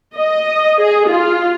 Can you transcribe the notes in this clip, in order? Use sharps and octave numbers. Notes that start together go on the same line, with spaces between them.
D#5
G#4
F4